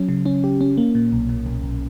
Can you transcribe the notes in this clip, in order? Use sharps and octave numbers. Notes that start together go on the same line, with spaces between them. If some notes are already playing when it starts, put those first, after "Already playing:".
Already playing: F#3 C#4
C#3
C#4
G4
C#4
A#3
A#2
B1
A#2
B1
B1